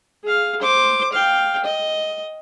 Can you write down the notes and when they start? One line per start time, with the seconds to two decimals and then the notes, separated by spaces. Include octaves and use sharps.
0.24 G#4 F5
0.60 C5 D6
1.13 F5 G5
1.65 D#5